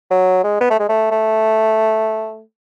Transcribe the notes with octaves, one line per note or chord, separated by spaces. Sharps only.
F#3
G#3
B3
A3
G#3
A3
A3